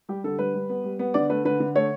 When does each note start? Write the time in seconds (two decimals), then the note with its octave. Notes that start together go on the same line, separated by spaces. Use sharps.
0.09 G3 G4
0.24 D3 A4
0.39 G3 B4
0.54 G3
0.69 B3
0.84 G3
0.99 B3
1.14 D3 D5
1.30 A3 B4
1.45 D3 B4
1.60 D3
1.75 A3 C#5